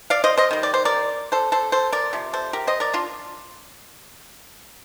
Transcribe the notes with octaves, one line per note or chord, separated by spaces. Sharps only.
D5 F5
C5 D#5
C5 D#5
D#3 G3
D5
C5
A#4 D5
A4 C5
A4 C5
A4 C5
A#4 D5
C3 F3
A4 C5
G4 A#4
C5 D#5
A#4 D5
D4 F4